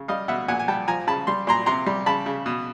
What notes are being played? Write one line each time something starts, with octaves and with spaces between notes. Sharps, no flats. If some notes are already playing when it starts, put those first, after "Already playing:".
Already playing: C#3
G3 D#5 F5
B2 E5 F#5
A#2 F#5 G#5
G#5
G3 G5 A5
F3 G#5 A#5
C#3 A5 B5
G3 C6
A#2 A#5 C6
C3 A#5 C6
G3
C#3 A5 B5
C#3
B2